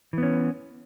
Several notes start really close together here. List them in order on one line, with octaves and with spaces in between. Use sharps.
E3 B3 C#4